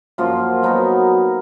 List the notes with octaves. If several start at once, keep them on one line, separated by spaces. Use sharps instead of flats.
F#2 F3 A#3 F4
F#3 B3 D#4 A#4